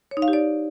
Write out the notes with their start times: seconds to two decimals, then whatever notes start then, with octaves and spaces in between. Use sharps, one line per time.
0.11 C#5
0.17 D#4
0.22 F5
0.28 G4
0.33 D5